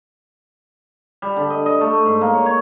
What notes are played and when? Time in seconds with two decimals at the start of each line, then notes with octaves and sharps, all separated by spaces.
1.22 G3
1.36 D3
1.50 D#5
1.66 D#5
1.81 A3
2.06 G#2
2.21 A#3
2.33 C#5
2.46 C#5